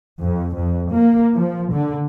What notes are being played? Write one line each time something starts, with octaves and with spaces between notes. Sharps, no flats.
F2
F2
A#3
F3
D3